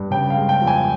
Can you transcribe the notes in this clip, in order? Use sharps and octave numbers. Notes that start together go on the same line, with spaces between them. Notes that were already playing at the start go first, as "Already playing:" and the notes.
Already playing: G2
C#3 G5
F5
G#3
G5
F2
G#5